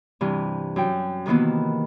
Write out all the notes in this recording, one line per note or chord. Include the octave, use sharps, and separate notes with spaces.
G2 C3 E3
F#2 G5
C3 D#3 E3 A#3 B3